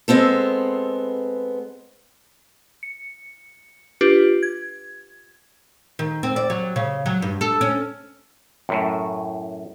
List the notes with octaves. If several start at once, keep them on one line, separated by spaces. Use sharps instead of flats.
G#3 B3 C4 A4
C#7
D4 F4 G4 B4
G#6
D#3
C4
D5
F#3
C#3
F#3
G2
A4
C#4
F#2 A2